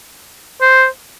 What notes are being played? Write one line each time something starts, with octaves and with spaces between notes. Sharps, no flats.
C5